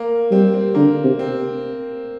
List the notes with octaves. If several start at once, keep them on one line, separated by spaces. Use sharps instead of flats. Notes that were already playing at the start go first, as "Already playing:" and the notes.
Already playing: A#3
G3 C4
C4
D3 A#3
C3
C4